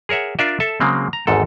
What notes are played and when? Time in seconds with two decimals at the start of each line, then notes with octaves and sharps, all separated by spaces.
0.09 G#4 A#4 C#5 E5 F#5
0.39 D4 F4 A#4 D5 E5
0.60 A4 E5 A5
0.80 C#3 F#3 G#3 A#3 C4
1.13 A#5
1.27 G#1 E2 G#2 A4